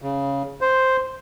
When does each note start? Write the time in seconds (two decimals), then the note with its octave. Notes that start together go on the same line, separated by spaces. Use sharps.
0.02 C#3
0.61 C5